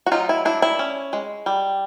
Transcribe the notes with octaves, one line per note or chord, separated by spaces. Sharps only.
F#4
F#3 D#4 F4
E4
D4 E4
E4
C#4
G#3
G3